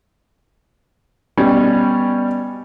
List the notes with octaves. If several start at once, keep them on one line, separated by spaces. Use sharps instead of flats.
B2 G3 C#4